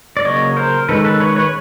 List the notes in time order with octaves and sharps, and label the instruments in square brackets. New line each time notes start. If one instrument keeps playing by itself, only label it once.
[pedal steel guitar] D5
C#3 F#3 A#3 C#5 D#5
A#4 C5
D#3 G#3 C#4 A4 B4
A4 B4
B4 C#5
B4 C#5